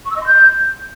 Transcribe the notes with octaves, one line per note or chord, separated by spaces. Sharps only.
C#6
E6
D#5
C6
G6